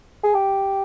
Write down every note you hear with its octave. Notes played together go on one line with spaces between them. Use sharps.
G#4
G4